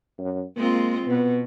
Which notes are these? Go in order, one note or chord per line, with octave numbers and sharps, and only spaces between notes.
F#2
G#3 A#3 C4 F4
B2 B3